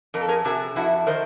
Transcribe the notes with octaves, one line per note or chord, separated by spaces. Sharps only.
F2 A#4
A4
G#4 A#4
C3 F#4 G#4
F2 E4 F#4
D#3 A#4 C5